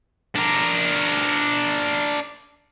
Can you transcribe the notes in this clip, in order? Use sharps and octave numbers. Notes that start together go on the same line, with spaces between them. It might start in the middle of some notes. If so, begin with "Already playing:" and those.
D4 A#4